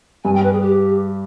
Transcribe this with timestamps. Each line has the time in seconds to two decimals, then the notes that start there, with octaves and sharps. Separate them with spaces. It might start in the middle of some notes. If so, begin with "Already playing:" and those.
0.24 G2 G#5
0.34 G5
0.43 B4
0.53 G#4
0.62 G4